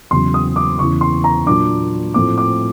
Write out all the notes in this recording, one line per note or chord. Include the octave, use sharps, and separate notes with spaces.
E2 C#3 F#3 C6
D#6
D6
E2 C#3 E3 C#6
C6
A#5
A#2 F#3 A#3 D4 D6
A2 F3 A3 C4 D6
D6